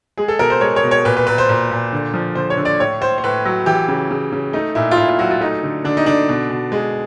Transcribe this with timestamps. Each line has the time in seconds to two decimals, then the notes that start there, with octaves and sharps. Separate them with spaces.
0.17 G#3 G#4
0.28 A4
0.39 B2 A#4
0.50 C5
0.61 G#3 C#5
0.76 C#5
0.83 B2
0.91 C#5
1.05 A#2 B4
1.17 B4
1.27 A#2 B4
1.38 C5
1.49 A#2
1.71 A#2
1.93 D3
2.14 F3
2.35 D3 C5
2.50 C#5
2.57 D3
2.65 D5
2.80 A2 C#5
3.01 A2 C5
3.18 C5
3.24 A2 B4
3.45 F#3
3.66 E3 G4
3.88 C#3
4.11 C#3
4.32 C#3
4.53 A3 D#4
4.75 A#2 E4
4.91 F4
4.97 A#2 E4
5.09 F4
5.19 F#3 F#4
5.31 F4
5.41 A3 D#4
5.63 D3
5.84 D3 D4
5.97 D#4
6.06 D3 D4
6.29 B2
6.50 B2
6.72 G#3